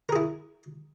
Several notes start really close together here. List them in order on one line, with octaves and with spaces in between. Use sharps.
A#4 G#4 E4